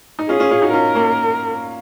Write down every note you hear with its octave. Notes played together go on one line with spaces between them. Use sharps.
D#4
C#4 F4 G#4
C#4 F4
C#4 F4
D#4 F#4
C#4 F4 A#4
A#3 C#4